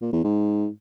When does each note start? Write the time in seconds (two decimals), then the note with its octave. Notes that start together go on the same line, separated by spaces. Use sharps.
0.02 A#2
0.13 E2
0.24 G#2